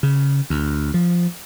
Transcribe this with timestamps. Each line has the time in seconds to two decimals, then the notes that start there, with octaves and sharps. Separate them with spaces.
0.03 C#3
0.50 D2
0.94 F3